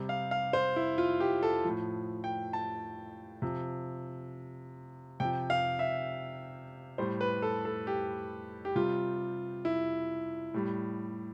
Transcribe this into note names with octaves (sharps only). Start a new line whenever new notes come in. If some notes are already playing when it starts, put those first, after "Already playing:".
Already playing: C3 G3
F5
F5
C5
E4
F4
G4
A4
A2 F3
G5
A5
C3 F3
C3 F3 G5
F5
E5
A2 G3 C5
B4
A4
A4
G4
G4
C3 G3 F4
E4
A2 G3